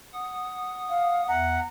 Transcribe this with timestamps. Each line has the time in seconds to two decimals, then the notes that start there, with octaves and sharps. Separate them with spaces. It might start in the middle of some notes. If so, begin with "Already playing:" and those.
0.14 F#5 D#6
0.89 F5
1.28 E2 E5 F#5 A#5